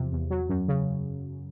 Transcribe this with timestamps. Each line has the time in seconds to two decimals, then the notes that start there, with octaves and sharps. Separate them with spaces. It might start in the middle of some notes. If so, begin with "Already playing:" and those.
Already playing: E2 C3 F3
0.12 E2
0.31 F#3
0.49 F#2
0.68 C#3